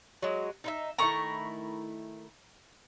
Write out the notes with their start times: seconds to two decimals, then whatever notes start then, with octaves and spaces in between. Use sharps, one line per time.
0.22 F#3 G#3
0.64 D#4 E4 E5
0.98 D#3 A3 E4 A#5 C#6